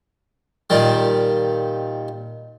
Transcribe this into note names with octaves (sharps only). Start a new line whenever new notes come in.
A#2 D#3 G3